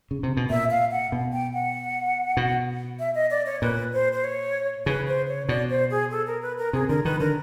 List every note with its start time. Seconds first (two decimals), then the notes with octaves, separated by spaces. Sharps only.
0.11 C#3
0.23 C3
0.37 B2
0.50 A#2 E5
0.71 F5
0.92 F#5
1.12 B2
1.33 G5
1.54 F#5
2.37 B2
2.99 E5
3.15 D#5
3.31 D5
3.46 C#5
3.62 A#2 B4
3.93 C5
4.13 C5
4.24 C#5
4.86 C#3 B4
5.07 C5
5.28 C#5
5.48 B2 D5
5.70 C5
5.91 G#4
6.11 A4
6.27 A#4
6.42 B4
6.58 A#4
6.73 C3 G#4
6.89 D3 A#4
7.05 D#3 B4
7.20 D3 A#4